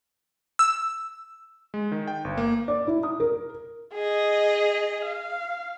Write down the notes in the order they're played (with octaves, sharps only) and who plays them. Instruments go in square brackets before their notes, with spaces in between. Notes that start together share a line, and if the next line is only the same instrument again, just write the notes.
[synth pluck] E6
[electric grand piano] G#3
D#3
G5
G1
A#3
[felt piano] D5
E4
D#6
A#4
[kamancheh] G#4 D#5
F5